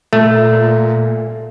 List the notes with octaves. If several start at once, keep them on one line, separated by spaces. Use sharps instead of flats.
A#2 A3